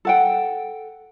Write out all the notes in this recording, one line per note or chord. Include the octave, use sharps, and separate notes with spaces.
A4 F#5 G5